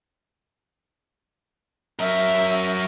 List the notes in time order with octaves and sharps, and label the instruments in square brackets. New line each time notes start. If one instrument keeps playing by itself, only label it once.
[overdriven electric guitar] F#3 A#4 [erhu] E5